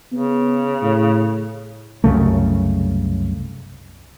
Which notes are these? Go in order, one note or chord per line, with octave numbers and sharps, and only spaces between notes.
C#3 B3
A2
C2 F#2 C#3 A3